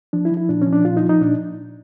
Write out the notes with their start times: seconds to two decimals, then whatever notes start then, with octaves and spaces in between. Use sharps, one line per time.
0.13 F3 D4
0.25 E4
0.32 F3
0.37 E4
0.49 A#2 D4
0.62 C#4
0.67 F3
0.73 D4
0.85 A#2 F4
0.97 D#4
1.03 F3
1.09 D#4
1.21 A#2 D4